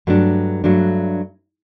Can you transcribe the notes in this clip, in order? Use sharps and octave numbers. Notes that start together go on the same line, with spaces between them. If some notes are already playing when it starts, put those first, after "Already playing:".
G2 F#3 A3 D4
G2 F#3 A3 D4